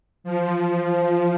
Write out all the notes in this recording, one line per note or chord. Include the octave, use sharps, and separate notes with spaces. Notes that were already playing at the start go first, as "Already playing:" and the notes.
F3